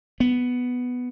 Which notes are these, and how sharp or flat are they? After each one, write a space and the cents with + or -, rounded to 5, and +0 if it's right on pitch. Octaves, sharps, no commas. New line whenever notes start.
B3 +5